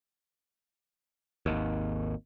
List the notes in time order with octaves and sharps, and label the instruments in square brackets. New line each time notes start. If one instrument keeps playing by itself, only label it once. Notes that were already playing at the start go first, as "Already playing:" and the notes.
[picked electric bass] G#1 D#2